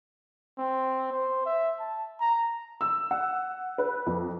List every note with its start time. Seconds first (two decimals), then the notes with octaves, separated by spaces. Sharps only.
0.58 C4
1.12 C5
1.46 E5
1.79 A5
2.20 A#5
2.81 E6
3.11 F#5
3.78 B4
4.06 F2